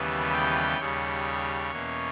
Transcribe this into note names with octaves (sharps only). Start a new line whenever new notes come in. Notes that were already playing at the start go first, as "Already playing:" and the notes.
Already playing: D#2 C#3 E3 G3 B3 E5
G5
D#2 C#3 G3 C#5
E2 B2 A#3 C#4